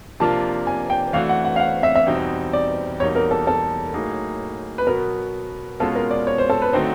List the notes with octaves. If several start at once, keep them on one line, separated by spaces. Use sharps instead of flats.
C3 F3 A#3 D4 F4 A5
G#5
G5
E3 A3 D4 F#4 F5
F#5
F#5
F5
F#5
E5
E5
E2 B2 G3 C4 D#4
D5
E2 B2 G3 A#3 D#4 C#5
A#4
A4
A4
A2 F#3 A#3 D#4 G#4
B4
B2 F#3 B3 A#4
B2 G#3 C#4 F4 A4
A#4
D5
C#5
C5
A4
B4
D3 F#3 A3 C4 D#4 C5